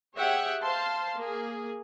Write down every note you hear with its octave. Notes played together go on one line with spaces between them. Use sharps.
G4 G#4 C#5 E5 F#5 G5
C5 F5 A5 C6
A#3 G#4